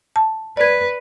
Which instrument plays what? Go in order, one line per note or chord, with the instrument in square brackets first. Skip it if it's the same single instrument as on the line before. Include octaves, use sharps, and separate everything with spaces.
[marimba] A5
[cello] B4 [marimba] D5 G#6